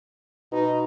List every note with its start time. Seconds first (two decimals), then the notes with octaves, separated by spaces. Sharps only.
0.52 B2 D#4